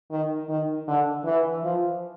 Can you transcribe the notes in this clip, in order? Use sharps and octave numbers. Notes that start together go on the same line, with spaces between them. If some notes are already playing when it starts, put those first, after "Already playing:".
D#3
D#3
D3
E3
F3